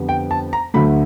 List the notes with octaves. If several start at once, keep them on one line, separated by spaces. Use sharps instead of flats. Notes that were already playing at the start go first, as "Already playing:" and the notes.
Already playing: F2 D3 G3 B3
G5
A5
A#5
D2 D3 F#3 A3 B5